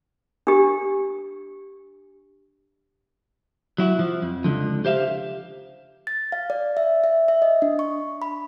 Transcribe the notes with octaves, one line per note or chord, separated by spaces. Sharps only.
D4 G4
F#3 E4 F#4
F3
F2
C#2 D3 F3
G4 C5 E5 F5
A6
F5
D5
E5
E5
E5
D#5
D4
C#6
B5